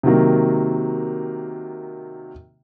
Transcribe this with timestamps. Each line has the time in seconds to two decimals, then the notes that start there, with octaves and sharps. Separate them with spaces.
0.03 C3 D#3 F#3 A#3